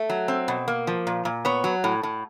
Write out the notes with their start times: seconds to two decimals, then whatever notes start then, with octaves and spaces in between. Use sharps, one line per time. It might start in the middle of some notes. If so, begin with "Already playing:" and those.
Already playing: A3
0.10 F#3
0.28 C4
0.48 B2
0.68 A#3
0.87 F3
1.07 A#2
1.25 A#2
1.45 B3 C#5
1.64 F#3
1.84 A2
2.03 A2